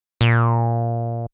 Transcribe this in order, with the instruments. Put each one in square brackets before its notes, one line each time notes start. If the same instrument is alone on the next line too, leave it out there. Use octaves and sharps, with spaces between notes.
[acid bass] A#2